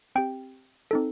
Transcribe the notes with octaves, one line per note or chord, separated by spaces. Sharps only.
C4 G4 G5
C4 D#4 A4